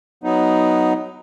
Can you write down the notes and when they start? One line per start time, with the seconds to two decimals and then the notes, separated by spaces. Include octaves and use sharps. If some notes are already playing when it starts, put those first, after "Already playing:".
0.24 F#3 B3 D#4